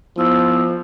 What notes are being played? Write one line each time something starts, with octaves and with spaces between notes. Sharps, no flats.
F3 B3 E4 E6